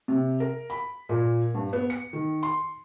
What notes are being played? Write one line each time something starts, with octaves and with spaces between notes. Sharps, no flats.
C3
A#4
B5
A#2
G2
B3
C#7
D#3
C6